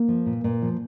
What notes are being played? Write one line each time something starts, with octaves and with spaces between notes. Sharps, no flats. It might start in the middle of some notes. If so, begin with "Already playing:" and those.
Already playing: A#3
F3
A#2
A#2
F3